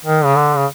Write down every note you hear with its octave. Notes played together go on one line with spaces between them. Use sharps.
D#3
C#3
D3
C#3